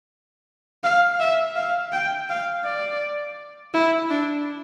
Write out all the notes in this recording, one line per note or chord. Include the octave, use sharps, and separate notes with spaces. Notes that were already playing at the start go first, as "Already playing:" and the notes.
F5
E5
F5
G5
F5
D5
E4
D4